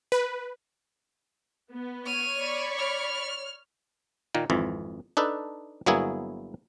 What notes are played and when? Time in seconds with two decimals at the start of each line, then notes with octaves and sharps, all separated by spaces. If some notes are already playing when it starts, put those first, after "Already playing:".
0.12 B4
1.72 B3
2.06 C#5 F6 D#7
2.40 D5 B5 C#6
2.78 F6
4.34 A#2 D#3 A#3
4.50 G#1 F2 E3
5.17 D4 D#4 A4 B4
5.86 G1 F#3 A#3 B3 E4 G#4